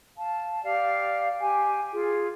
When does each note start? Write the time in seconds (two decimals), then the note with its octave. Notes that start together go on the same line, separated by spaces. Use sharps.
0.16 F5 A5
0.63 G4 D5 F5
1.39 G4 G#5
1.93 F4 G#4